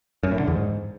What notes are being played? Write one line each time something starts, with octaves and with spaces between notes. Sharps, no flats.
F#2
A2
D3
E2
G#2